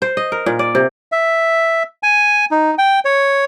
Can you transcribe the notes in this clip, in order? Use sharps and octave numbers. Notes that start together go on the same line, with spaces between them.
C5
D#5
A#4
A#2
D5
C3
E5
G#5
D#4
G5
C#5